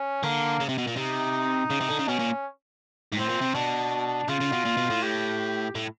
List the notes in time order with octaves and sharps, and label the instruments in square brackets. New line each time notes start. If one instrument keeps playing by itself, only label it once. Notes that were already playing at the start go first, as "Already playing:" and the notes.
Already playing: [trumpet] C#4
[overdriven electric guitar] D3 [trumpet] A#3
[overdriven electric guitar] C#3
C3
B2
A#2
[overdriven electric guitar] C3 [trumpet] D#4
[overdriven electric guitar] C#3
C3
D3
C#3
[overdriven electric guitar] B2 [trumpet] C#4
[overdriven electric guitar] A#2
G#2
[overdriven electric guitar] A2 [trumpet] C4
[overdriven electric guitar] A#2
C3
[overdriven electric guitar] B2 [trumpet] D4
[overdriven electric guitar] C#3 [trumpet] F4
[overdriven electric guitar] C#3
B2
A#2
B2
A2
[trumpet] G4
[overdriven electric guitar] A2